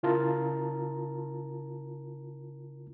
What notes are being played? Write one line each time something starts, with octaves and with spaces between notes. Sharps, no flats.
C#3 E4 F4 A#4 A5 A#5